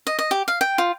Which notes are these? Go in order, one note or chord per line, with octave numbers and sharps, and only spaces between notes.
D#5
D#5
G4
F5
G5
F4